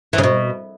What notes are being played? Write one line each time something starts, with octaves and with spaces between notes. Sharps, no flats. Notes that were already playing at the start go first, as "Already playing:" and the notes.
E3
C#3
B2